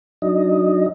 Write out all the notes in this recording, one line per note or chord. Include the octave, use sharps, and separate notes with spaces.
F#3 D4 D#4 D#5